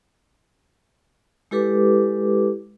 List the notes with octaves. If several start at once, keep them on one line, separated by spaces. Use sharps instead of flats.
G#3 E4 G4 A4 B4 D6